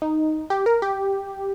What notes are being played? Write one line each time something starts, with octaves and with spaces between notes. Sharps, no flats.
D#4
G4
A#4
G4